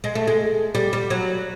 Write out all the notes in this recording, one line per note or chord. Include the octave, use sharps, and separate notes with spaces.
G#3
A3
G#3
G3
G3
F#3